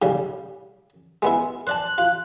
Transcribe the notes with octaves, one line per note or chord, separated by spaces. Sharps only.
G#2 C#3 G3
G#3 B3 E4
C5 D5 A5 F#6
F4